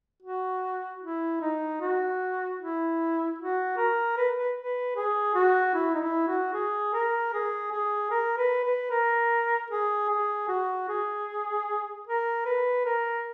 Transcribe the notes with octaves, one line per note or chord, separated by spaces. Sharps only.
F#4
E4
D#4
F#4
E4
F#4
A#4
B4
B4
B4
G#4
F#4
E4
D#4
E4
F#4
G#4
A#4
G#4
G#4
A#4
B4
B4
A#4
G#4
G#4
F#4
G#4
A#4
B4
A#4